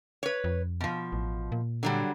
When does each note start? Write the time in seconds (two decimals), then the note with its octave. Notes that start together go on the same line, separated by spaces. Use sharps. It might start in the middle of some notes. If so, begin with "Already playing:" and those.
0.23 B4 C#5
0.44 F2
0.81 B2 F3
1.12 A1
1.52 A#2
1.83 D3 F#3 G3